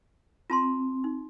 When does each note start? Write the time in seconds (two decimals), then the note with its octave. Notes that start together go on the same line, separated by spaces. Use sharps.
0.50 C4 F4 A5 C6
1.04 D#4